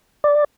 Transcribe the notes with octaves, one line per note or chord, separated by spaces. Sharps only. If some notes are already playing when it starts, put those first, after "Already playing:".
D5